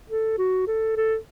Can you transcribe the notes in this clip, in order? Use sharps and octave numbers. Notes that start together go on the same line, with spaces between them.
A4
F#4
A4
A4